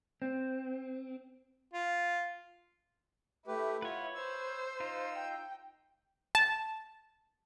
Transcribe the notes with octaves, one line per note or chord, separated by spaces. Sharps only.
C4
F4
A3 E4 G4 B4
F4 B4 C#5 F#5
C5 E6
D#4 F4
G5
A5